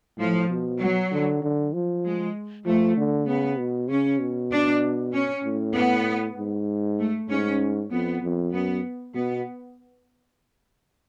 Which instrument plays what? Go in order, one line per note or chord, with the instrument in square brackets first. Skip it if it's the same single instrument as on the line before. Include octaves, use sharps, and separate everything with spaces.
[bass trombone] A2 [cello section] F3
[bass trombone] B2
[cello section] F#3
[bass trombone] D3
D3
F3
[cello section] G#3
[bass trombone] F3 [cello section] A3
[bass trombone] D3
[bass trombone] C#3 [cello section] B3
[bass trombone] B2
[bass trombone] C#3 [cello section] C#4
[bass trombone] B2
[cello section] D4
C#4
[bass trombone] A2
[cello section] B3
[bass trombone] G#2
[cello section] A3
[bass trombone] G#2 [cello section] C#4
[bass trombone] F2 [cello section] B3
[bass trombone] F2
[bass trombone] F#2 [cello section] B3
[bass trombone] B2 [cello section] B3